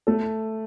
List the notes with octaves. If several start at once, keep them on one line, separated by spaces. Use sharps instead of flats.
A3 A4